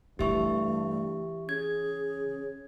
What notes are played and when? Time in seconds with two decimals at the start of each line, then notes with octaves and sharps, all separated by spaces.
0.19 G2 C#3 E3 A3 G4 E5 C#6
1.49 C#4 G#4 G#6